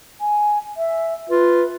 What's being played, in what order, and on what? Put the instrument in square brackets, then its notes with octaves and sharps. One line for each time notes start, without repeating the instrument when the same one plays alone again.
[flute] G#5
E5
[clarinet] F4 [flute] B4